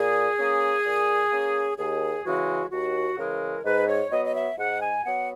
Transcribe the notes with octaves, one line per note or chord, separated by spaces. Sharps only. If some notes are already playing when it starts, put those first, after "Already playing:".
Already playing: A#2 G#4
A#3 C#4
A#2
A#3 C#4
D#2 G#4
C#3 E3 G#3 F#4
D#2 F#4
C#3 E3 G#3 A#4
G#2 B4
C#5
F#3 B3 D#5
D#5
E5
G#2 F#5
G#5
F#3 B3 F#5